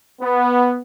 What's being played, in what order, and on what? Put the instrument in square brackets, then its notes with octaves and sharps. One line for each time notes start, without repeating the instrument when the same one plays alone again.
[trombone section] B3